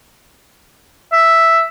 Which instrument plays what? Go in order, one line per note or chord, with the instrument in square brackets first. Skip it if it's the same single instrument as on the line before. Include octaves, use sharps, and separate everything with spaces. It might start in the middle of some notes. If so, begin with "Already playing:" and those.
[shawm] E5